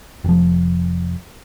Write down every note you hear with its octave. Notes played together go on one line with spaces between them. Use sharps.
F1 F3